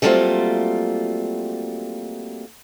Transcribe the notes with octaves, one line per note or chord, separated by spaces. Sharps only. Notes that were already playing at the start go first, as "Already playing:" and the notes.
F#3 G3 A3 A#3 C4 F4